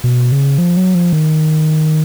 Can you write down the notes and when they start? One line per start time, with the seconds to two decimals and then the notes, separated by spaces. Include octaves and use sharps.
0.04 B2
0.32 C#3
0.58 F3
0.77 F#3
0.95 F3
1.13 D#3